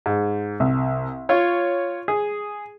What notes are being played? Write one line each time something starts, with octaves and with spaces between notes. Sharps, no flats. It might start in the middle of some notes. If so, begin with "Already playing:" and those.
G#2
C2
F4 C#5
G#4